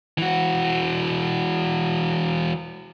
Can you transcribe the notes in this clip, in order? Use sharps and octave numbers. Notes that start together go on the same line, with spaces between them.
E3 F#4